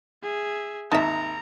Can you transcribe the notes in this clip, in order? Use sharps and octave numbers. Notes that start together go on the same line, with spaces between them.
G#4 E5
G#1 D#2 D#4 E5 A5 A#5